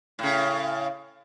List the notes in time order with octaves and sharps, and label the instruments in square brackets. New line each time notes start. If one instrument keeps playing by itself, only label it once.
[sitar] A2 C#3